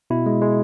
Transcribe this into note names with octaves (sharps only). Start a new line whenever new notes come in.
B2 E4
G#3
G#3